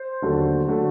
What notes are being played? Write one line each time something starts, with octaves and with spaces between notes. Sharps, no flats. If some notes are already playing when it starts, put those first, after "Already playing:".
Already playing: C5
D#2 D3 F#3 A3
D3 F#3 A3